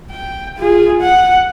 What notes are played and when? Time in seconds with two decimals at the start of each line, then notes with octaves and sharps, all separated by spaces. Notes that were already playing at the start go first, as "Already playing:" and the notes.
0.11 G5
0.58 F4 G#4
1.01 F#5